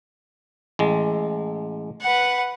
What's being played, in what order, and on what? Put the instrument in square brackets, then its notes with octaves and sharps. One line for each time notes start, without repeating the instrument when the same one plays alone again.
[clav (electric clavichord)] A1 G#3
[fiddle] B4 F#5